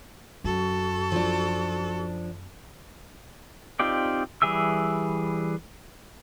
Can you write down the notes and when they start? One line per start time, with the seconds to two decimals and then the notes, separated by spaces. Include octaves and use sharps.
0.44 F#2 F#4 A4
1.12 F3 D4
3.80 C4 D#4 F4 G4 D5
4.42 E3 G3 G#4 E5 E6